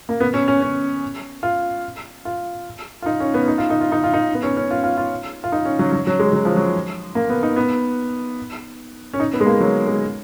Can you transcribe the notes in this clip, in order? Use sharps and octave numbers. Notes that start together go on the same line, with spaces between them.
A#3
B3
C#4
C#4
C#4
F4
F4
F4
D#4
C#4
B3
D#4
F4
D#4
F4
D#4
F4
D#4
B3
C#4
C#4
F4
F4
F4
F4
D#4
C#4
F#3
F#3
F#3
G#3
F#3
F3
F#3
A#3
B3
D#4
B3
C#4
D#4
B3
G#3
A#3
F#3
G#3